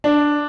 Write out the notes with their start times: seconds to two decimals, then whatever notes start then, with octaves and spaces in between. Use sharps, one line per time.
0.04 D4